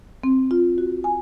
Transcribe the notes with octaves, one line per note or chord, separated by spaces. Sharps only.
C4
F4
F#4
G#5